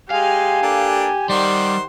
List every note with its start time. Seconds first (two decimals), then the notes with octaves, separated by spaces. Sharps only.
0.11 G#3 G4 F5 G#5
0.62 A#3 D4 A4
1.29 D#3 G3 C5 D5 F#5